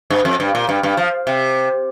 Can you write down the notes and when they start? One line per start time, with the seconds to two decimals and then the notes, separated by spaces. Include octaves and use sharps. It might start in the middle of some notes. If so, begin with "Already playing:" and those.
0.10 G2
0.25 F2
0.40 G2
0.55 A#2
0.69 G2
0.83 G2
0.97 F3
1.27 C3